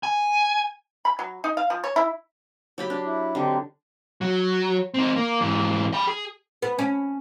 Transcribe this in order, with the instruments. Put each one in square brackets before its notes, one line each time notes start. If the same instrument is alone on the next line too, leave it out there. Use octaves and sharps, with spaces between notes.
[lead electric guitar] G#5
[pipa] B5
F#3
D#4
F5
F3
C#5
E4
[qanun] F#3 G4 B5
D4
[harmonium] E4
[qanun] D3 [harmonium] C4 D#4 G4
[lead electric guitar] F#3
C4 D#4
A#3
G#2 E3
G5 B5
G#4
[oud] B3
C#4